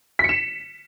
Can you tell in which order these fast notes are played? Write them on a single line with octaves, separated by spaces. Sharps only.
B6 C#7 E7